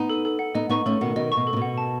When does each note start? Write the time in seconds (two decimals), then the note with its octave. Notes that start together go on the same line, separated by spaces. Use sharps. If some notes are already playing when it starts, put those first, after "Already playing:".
Already playing: B3 D#4
0.10 A4
0.25 A4
0.39 F#5
0.55 B3 D#4 D#5
0.69 B3 D#4 C#6
0.86 A3 C#4 A4
1.01 B2 D#3 F#5
1.16 B2 D#3 D#5
1.32 B2 C#6
1.47 A4
1.53 C#3
1.57 B2
1.62 F#5
1.78 A5